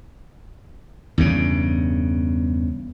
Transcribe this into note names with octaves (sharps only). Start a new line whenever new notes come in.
E2 G2 C#3